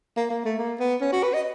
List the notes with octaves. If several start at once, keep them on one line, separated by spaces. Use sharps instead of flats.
A#3
A#3
A3
A#3
B3
C#4
F#4
B4
D#5